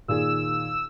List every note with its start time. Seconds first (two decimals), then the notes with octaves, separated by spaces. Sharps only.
0.08 A#2 D#3 G#4 E6